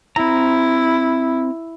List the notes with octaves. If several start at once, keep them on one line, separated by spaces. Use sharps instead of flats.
C4 E4 A#5